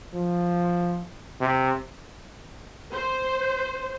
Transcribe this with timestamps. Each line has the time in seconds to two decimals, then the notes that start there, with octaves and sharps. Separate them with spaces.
0.14 F3
1.41 C3
2.92 C5